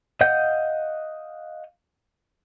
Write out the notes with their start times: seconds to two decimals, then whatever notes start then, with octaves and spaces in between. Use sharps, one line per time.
0.21 D#5 F5 F#5 G6